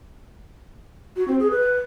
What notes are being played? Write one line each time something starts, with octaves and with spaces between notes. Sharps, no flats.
F#4
C4
G#4
B4